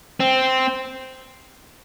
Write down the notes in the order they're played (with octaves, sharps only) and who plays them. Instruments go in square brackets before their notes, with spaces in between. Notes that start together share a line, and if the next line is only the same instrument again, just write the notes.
[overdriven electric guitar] C4